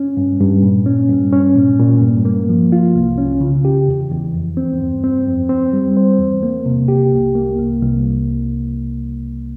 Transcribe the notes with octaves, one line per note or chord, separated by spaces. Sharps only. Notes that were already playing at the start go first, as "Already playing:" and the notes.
Already playing: C#4
G2
G2
A#2
C#4
G2
C#4
A#2
A#2
G2
A#3
F3
F4
C2
C#4
C#3
G4
E2
E2
F2
C4
G2
C4
F2
C4
G3
C5
E2
A#3
C3
G4
C2
A#3
C2
C2